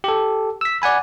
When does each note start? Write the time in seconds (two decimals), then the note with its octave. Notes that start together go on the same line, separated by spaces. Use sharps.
0.04 G4 A4
0.61 E6 B6
0.82 D5 F#5 G#5 B5